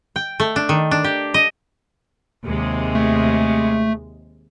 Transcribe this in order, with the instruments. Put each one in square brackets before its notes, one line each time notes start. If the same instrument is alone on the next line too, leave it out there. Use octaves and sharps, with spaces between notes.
[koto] G5
A3
D4
D#3
D4
G4
D#5
[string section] D#2 C3 G#3
[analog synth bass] A3